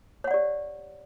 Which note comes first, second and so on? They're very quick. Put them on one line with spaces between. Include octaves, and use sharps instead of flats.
C#5 F#5 D5 G4